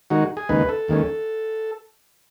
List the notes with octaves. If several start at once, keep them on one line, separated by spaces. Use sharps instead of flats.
D#3 G#3 D#4 F#4
G#4
D#2 C#3 G#3 D#4 B4
A4
D#2 D#3 G#3 C#4